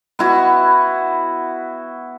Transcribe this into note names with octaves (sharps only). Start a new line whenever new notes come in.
B3 E4 F#4